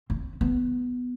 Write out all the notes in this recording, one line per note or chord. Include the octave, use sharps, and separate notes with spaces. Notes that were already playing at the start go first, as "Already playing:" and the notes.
C4
B3